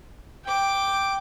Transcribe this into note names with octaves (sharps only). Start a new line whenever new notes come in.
G5 D6